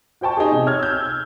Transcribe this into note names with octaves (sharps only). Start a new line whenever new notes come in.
F#4 C5 G5 A5 C#6
D#4 G4 G#4
C3
C#5 F6 G#6
E6 G6